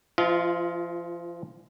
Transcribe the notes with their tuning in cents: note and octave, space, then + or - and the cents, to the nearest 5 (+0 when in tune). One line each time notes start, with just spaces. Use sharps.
F3 -35 F4 +0 D#5 +40